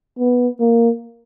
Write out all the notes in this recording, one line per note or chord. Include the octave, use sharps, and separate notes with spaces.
B3
A#3